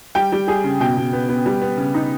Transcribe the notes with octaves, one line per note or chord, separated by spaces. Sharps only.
G3 G5
G3
G3 G#4
C#3
B2 G5
B2
B3
B3
G3
B3
C#3
D#4